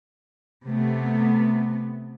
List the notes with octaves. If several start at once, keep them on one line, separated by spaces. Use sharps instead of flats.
C3 A3 B3